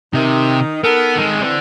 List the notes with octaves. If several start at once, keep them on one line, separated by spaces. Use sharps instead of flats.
C3 D#3 D#4
B3 D#4 A4 A#4
D#3 G#3
D3 E3 C4